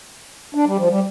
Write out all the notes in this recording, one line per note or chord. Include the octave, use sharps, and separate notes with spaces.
D4
G3
F3
G3